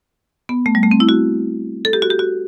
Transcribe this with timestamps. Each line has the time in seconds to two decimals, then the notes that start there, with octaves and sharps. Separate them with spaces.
0.49 B3
0.66 A3
0.75 G3
0.83 A3
0.91 C4
1.00 E4
1.09 F#4
1.85 A4
1.93 G4
2.02 F#4
2.10 G4
2.19 F#4